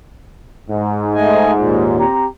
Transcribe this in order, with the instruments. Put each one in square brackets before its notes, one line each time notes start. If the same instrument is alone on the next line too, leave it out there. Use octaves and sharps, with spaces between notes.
[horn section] G#2
[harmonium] A3 D#5 G#5
D#2 A#2
[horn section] C4 G4 A#5